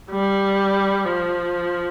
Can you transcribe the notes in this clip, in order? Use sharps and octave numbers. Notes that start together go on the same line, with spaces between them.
G3
F3